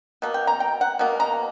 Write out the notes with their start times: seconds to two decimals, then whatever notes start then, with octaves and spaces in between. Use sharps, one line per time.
0.22 B2 A#3
0.34 G5
0.47 A#5
0.60 G5
0.81 F#5
0.99 B2 A#3
1.20 A#5